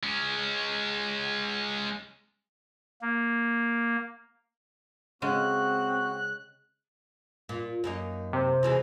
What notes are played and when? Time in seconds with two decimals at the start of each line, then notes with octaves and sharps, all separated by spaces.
0.03 G#3 C#4
3.02 A#3
5.22 C#3 G#3 C4 C#4 F#4 F#6
7.49 A#2
7.84 F#2 A#3 D#4
8.33 C3 C5
8.63 B2 E3 G#3